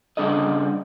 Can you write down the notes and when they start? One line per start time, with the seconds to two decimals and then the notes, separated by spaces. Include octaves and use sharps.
0.17 C#3 G3 D4 G#4 A4 D#5